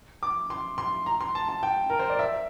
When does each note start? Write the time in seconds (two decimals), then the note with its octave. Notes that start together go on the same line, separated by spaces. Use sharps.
0.23 D6
0.50 C6
0.78 C6
1.06 A#5
1.21 C6
1.35 A5
1.49 A5
1.63 G5
1.90 A#4
1.99 C5
2.10 D5
2.19 E5